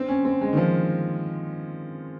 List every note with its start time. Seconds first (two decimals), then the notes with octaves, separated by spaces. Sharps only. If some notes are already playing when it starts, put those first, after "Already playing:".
Already playing: C4
0.08 C#4
0.25 C4
0.41 G#3
0.53 D#3
0.57 F3